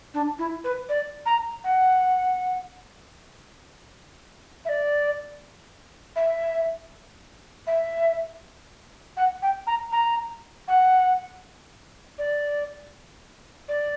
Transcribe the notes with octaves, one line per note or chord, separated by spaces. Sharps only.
D4
E4
B4
D5
A#5
F#5
E5
D5
E5
E5
F#5
G5
A#5
A#5
F#5
D5
D5